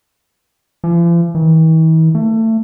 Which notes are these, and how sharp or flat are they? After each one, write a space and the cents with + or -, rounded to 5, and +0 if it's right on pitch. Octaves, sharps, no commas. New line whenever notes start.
F3 -45
E3 -45
A3 +25